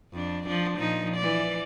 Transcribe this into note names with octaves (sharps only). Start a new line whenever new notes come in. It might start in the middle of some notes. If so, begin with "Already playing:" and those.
F2 D4
F3 D4
A#2 F3 D#4
E3 D5